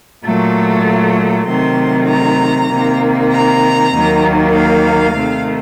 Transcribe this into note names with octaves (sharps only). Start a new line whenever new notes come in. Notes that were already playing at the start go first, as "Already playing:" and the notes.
A#2 F#3 A3
C3 D#3 F#3 A3 C6
A#5
C3 D#3 A#3
A#5
D#2 D#3 F#3 A#3
F5
C3 D#3 A3